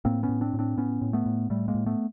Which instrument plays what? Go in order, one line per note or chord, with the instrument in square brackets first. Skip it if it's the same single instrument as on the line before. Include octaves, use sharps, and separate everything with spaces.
[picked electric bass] A2 A#3 C4
B3 C#4
A2
C4 D4
A2
C4 D4
A2 B3 C#4
A2
A3 B3
A2
A2 G3 A3
G#3 A#3
A2
A3 B3